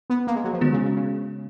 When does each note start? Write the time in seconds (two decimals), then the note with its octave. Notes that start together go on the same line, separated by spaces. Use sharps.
0.10 B3
0.27 A#3
0.36 G#3
0.44 F#3
0.53 F3
0.61 D#3 G#3 B3 F#4
0.73 C#3
0.85 C#3
0.96 C#3